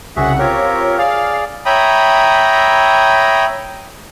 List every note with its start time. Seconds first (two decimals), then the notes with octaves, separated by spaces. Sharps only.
0.16 C2 C#3 F#4 G#4 E5 F#5
0.38 C4 F4 G4 A#4 C#5
0.98 G#4 D5 F5
1.65 C#5 E5 G5 A#5 B5 D#6